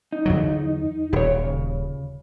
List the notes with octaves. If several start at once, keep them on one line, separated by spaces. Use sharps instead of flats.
D#4
E2 D3 F#3
D#1 G4 C#5
C#3